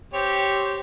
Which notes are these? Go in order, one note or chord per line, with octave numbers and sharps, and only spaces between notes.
C4 G4 C#5